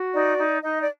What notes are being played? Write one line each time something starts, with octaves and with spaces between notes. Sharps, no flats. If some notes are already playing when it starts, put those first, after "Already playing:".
Already playing: F#4
D#4 D5
D#4
D#4 D#5
D5